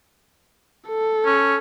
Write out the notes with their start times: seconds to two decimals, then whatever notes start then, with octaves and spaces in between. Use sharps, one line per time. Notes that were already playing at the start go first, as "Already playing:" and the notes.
0.88 A4
1.25 C#4